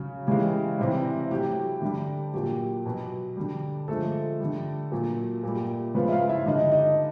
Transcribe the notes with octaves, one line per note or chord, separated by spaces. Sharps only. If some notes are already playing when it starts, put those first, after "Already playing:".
Already playing: C#3 F#3
C#3 E3 G#3 G4
C3 E3 G3
A2 F#3 G4
D3 G3
A#2 F#3 G4
B2 F#3
D3 G3
D3 F3 G#3 A3 A4
D3 G3
A#2 F#3
A#2 G3
C#3 F3 G#3 B3 B4
E5
F4 F5
E4 E5
D3 G3 D#4 D#5
D#4 D#5